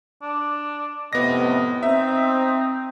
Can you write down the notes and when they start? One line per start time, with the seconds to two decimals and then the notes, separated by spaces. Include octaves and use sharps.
0.22 D4
1.13 F2 A2 C3 B3 D#5 A#6
1.83 C4 D#4 E5